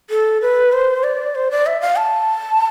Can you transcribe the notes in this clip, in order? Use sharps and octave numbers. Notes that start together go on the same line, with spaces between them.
A4
B4
C5
D5
C5
D5
E5
F5
A5